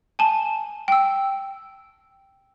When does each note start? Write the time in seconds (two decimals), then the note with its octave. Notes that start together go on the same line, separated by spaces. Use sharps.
0.19 G#5 A5
0.88 G5 E6